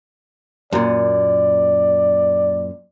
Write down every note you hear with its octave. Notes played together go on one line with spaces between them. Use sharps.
F#2 A#2 D5